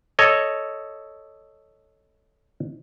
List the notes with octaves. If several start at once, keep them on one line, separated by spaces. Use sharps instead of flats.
A4 C#5 D#5